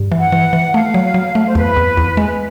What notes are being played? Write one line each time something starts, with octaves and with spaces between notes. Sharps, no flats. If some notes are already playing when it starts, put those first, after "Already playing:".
Already playing: G2
E3
F#5
E3
E3
A3 F5
F#3
F#3
A3
C5
E2 B4
E2
E2
G#3